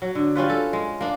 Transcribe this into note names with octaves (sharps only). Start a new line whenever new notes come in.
F#3
D3
G3 C#4 F4 B4
A4
G#3
A#3 D4